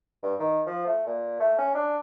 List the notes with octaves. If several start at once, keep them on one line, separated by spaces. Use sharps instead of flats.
G2
D#3
F3
A3
A#2
A3
C#4
D4